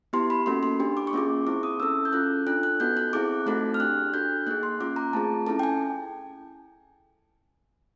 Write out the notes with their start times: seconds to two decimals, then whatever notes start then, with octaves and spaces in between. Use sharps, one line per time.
0.13 B3 E4 G4 C6
0.30 B5
0.46 A#3 C#4 F#4 A4 C6
0.63 C6
0.80 D4 G4
0.97 D6
1.07 C#6
1.13 A#3 C#4 F4 G#4 D6
1.47 C4 E4 G#4 D6
1.63 D#6
1.80 C#4 E4 A4 E6
2.05 G6
2.13 C#4 F4 A4 F#6
2.47 D4 F4 A4 F#6
2.63 F#6
2.80 B3 D#4 F#4 A4 G6
2.97 F#6
3.13 C4 E4 G#4 D6
3.46 A3 C4 D#4 F#4 A4 F#6
3.74 F6
3.80 D4 G4 F#6
4.14 D4 F#4 A4 G6
4.47 A#3 D#4 G#4 F#6
4.63 C6
4.80 A#3 C#4 F4 D6
4.96 A#5
5.13 A3 C4 F4 G#4 A5
5.46 C#4 E4 A4 A5
5.59 G5
5.63 G#5